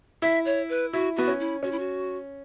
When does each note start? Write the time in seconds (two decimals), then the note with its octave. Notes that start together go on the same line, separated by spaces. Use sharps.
0.22 E4 E5
0.46 C#5
0.69 B4
0.93 E4 F#4
1.16 B3 F#4
1.28 C#4
1.40 E4
1.63 C#4 F#4
1.72 E4
1.79 F#4